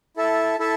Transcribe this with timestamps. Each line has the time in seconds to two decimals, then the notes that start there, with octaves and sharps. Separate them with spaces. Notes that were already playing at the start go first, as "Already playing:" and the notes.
0.16 E4 A4 E5 A5
0.59 E4 A4 E5 A5